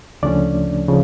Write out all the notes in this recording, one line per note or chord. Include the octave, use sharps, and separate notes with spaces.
D2 C#3 F3 A3 C#4 D4 D5
C#3 F3